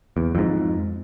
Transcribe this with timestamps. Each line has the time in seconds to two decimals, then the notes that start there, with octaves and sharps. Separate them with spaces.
0.17 E2
0.35 F2 G#2